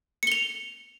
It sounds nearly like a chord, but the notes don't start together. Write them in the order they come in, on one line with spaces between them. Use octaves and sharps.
C#7 G7 F7